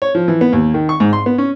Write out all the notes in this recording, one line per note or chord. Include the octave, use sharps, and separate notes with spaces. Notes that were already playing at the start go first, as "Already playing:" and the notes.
C#5
F3
E3
B3
D#2
D#3
C#6
G#2
C6
B3
C#4